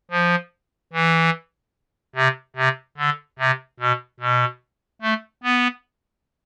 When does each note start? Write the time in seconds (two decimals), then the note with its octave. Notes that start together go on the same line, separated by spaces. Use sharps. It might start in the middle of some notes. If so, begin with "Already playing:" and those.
0.11 F3
0.93 E3
2.16 C3
2.56 C3
2.97 D3
3.39 C3
3.80 B2
4.20 B2
5.02 A3
5.43 B3